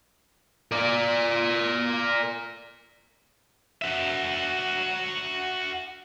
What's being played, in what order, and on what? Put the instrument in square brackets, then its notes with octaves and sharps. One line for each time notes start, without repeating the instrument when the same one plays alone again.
[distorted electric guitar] A#4 D5
F#4 E5